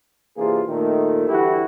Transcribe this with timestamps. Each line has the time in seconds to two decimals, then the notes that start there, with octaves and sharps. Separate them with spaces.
0.37 C3 E3 A#3 D4 F4 G#4
0.69 A#2 D#3 A3
1.28 D3 E3 G3 E4 F#4 G4